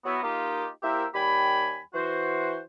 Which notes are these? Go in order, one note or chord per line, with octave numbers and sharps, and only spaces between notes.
F#3 B3 E4 F#4
A#3 D#4 F4 G4
A#3 E4 G4 A#4 C5 E5
D#2 G3 G4 G5 G#5 B5
E3 F#4 C5